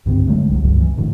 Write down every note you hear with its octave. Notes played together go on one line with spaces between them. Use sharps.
C2 G2 D3 C4
D3 F#3 G#3 A3
C2 F#3
C#2 G2 F#3
E3
F#2 A2 D3